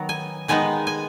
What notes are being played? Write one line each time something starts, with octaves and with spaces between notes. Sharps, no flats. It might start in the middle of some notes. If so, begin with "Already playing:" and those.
Already playing: D#3 F#3 B3 A#5
G#5
D#3 G#3 B3 D#4 G#5
G#5